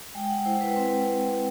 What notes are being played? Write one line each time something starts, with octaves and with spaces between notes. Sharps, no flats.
G#3 G5
G5
F#5
E4 C5
B4
C4 B4